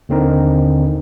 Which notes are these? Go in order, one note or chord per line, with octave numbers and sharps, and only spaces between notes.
D#2 D3 C4 D#4 A#4